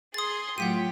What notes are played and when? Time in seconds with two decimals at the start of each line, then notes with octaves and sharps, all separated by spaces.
0.14 G#4 C6 D#6 A6
0.58 A2 F#3 F4 G4 F#5 B6 D#7